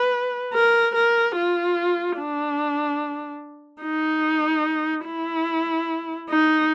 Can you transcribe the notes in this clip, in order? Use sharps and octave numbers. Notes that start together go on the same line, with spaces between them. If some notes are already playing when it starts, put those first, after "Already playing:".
Already playing: B4
A#4
A#4
F4
D4
D#4
E4
D#4